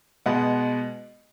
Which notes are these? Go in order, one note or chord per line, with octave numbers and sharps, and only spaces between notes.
B2 G#3 B3 F#5